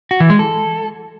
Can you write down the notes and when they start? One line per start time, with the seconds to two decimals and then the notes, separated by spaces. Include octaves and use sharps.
0.11 F#4
0.20 E3
0.30 G#3
0.39 A4